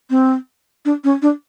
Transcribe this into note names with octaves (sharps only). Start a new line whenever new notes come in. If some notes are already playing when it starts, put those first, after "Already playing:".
C4
D4
C#4
D4